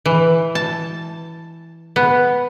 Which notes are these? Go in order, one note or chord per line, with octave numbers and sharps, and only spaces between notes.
E3
A5
B3